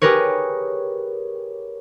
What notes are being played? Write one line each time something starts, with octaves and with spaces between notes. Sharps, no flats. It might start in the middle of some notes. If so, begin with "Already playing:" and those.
G4 G#4 A#4 B4 C#5